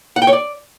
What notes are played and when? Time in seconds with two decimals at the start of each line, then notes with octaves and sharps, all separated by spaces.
0.16 F#5
0.22 G5
0.27 C#5
0.33 D5